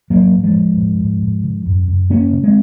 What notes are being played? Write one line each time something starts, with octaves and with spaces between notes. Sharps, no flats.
G#2 F#3 A#3
G#2
F3 G#3
G#2
G#2
G#2
G#2
C#3
F#2
F#2
C#3 A#3 C#4
C#3
G#3 C4